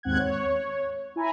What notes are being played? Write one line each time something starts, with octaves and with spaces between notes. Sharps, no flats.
D#2 G#2 C4 F#5 F#6 G#6
C#5
E4 G#5 A#5 B5